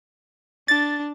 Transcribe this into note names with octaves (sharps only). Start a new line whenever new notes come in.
D4 A6